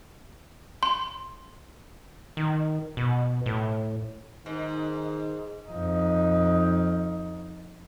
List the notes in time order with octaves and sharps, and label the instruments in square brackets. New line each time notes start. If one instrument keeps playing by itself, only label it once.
[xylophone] C6
[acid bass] D#3
B2
A2
[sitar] G#2 [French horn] D#3
[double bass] F2 D#4